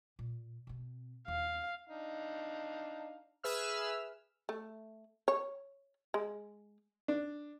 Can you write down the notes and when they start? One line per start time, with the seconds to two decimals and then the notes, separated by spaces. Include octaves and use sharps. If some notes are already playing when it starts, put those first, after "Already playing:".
0.19 A#2
0.67 B2 C4
1.28 D#2 F5
1.88 D4 D#4 F5
3.44 G#4 B4 E5 E6 F6
4.49 A3
5.28 C#5
6.14 G#3
7.08 D4